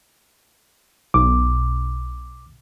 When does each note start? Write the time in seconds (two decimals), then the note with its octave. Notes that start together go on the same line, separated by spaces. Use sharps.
1.14 B1 D6